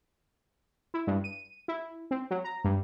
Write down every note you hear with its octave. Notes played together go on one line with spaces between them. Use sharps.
E4
G2
D#7
E4
C4
F#3
A#5
G2